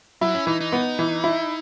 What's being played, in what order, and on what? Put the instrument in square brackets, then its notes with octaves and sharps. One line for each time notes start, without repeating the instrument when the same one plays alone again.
[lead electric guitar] F#3 [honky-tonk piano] E4
[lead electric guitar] C#4
[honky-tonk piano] E3 [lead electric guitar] D#4
[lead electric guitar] D#4
[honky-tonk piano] B3
E3
E4